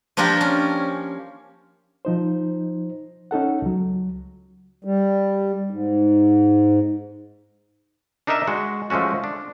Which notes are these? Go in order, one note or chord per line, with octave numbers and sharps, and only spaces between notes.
F3 A#3 D4 F4 G4 A#4
C#4
F3 D#4 C5
C#4 D#4 A4 F#5
C#2 F#3
G3
G#2
D4 D#4 A#4 D#5 E5
G#3 F#4
F3 G#3 A3 C#4 F#4
D4